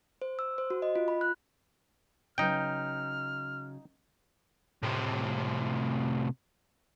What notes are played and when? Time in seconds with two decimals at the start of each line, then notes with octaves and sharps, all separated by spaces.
0.22 C5
0.39 E6
0.58 C5
0.70 F#4
0.82 D#5
0.96 F4
1.08 B5
1.21 F#6
2.38 C#3 F#3 D#4 B4 G5 F6
4.83 A2 C3